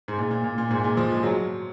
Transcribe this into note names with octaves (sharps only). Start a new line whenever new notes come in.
G#2
A#2
A#2
A#2
A#2
G#2
A#2
F3
G#3
F#3